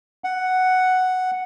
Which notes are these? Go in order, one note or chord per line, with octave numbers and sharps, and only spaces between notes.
F#5